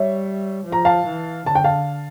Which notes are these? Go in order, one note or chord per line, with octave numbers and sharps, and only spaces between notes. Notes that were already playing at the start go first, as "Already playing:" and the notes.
Already playing: G3 C#5 E5
F3
A#5
F5 A5
E3
D3 A5
G5
F5 A5